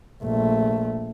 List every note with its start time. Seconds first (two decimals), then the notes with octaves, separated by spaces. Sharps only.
0.22 A#1 A3